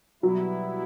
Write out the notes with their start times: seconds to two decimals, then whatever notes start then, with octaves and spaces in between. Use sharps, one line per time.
0.23 B2 F#3 G3 B3 E4